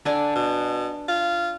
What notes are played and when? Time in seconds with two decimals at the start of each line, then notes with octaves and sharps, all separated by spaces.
0.05 D3 D4 G#5
0.36 B2
1.08 F4